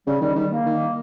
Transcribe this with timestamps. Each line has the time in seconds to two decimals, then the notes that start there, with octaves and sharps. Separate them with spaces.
0.07 C#3 G3
0.21 D#3 G3
0.36 D#3 G3
0.51 A#3
0.66 D#3